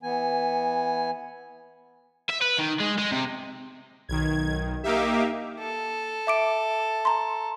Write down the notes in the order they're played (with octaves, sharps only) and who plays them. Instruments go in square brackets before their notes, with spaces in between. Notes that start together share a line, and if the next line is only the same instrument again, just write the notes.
[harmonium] E3 B3 G#5
[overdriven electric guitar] E5
B4
D#3
G#3
G#3
C3
[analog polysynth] B1 D#3 [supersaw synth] G#6
[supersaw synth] A#3 D#4 E5 [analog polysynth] G4 F5 D6
[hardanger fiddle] A4
[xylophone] E5 D6 D7
A#5 C6